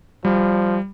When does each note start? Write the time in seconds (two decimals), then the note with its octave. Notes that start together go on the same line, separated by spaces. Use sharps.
0.25 F3 G3